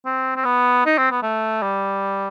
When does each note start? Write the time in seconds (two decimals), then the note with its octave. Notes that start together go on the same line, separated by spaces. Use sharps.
0.06 C4
0.36 C4
0.45 B3
0.86 D#4
0.98 C4
1.11 B3
1.23 A3
1.62 G3